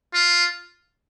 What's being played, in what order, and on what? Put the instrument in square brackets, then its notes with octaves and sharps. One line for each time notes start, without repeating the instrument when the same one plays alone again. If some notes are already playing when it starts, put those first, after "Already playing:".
[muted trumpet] F4